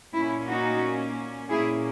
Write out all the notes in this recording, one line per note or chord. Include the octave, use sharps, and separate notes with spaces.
A#2 A#3 C#4 E4
D#4 F#4
A#2 A#3 C#4 E4 G#4